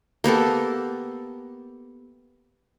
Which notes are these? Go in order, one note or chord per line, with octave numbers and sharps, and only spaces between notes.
A#3 B3 G4 A4